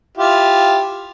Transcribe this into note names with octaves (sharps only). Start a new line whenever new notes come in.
E4 F4 G4